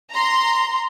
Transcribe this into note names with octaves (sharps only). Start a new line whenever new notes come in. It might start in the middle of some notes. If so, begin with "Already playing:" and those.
A#5 C6